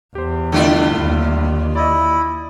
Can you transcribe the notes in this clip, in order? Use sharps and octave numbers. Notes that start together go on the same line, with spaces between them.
E2 G4 C5
C2 D3 A3 D4 E4 F4
D#2
E4 D5 D#5